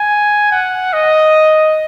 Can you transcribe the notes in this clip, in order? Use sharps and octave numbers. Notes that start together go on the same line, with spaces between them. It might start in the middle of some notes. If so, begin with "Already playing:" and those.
Already playing: G#5
F#5
D#5